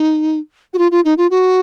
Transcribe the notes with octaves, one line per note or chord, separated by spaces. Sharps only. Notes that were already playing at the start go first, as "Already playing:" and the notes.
Already playing: D#4
F#4
F4
F4
D#4
F4
F#4